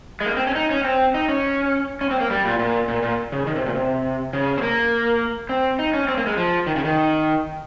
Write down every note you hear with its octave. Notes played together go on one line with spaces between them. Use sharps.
G#3
A#3
C4
C#4
D#4
C#4
C4
D#4
C#4
C#4
C4
A#3
G3
A#2
A#2
A#2
A#2
C#3
D#3
C3
A#2
C3
C#3
C4
A#3
C4
D#4
C#4
C4
A#3
G#3
F3
D#3
C#3
D#3